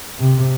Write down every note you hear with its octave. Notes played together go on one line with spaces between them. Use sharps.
C3